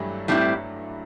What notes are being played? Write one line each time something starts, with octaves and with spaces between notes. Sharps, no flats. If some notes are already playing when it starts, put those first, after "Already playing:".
Already playing: G2 E3 F#3 G3 A3
A2 G3 C4 E4